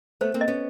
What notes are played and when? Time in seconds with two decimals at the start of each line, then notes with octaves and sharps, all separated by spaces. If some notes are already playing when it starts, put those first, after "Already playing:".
0.21 A3 B3 C5
0.34 A#3 C4
0.41 D#5
0.48 B3 C#4